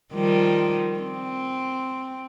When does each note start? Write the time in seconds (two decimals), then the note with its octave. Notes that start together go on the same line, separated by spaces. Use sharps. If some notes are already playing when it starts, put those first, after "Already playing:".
0.14 D#3 F3 G3
0.99 C4